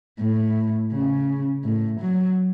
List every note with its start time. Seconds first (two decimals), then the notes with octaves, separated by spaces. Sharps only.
0.20 A2
0.92 C#3
1.64 A2
2.01 F#3